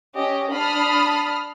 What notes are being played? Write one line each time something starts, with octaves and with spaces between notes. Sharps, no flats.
C#4 G4 D#5
D4 A5 B5 D#6 F6 C7